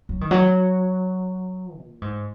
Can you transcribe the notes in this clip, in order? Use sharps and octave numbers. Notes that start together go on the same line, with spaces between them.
F#3
D#3
F#3
A#2
G#2